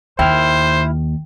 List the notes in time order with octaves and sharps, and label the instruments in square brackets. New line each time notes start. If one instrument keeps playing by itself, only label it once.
[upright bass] D#2 [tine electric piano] E4 F6 [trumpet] C5 [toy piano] G5